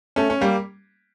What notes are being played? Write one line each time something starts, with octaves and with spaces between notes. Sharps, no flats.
A3 C#4
C#4
G3 A#3